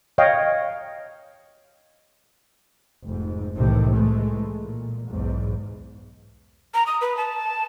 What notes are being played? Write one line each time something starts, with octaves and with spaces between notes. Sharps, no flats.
C#5 D#5 F5 G5
F1 G#2
C2 A2 C3 D#3 E3
E3 G#3 A3
A#2
B1 E2 G#2
A#5
D#6
B4
A5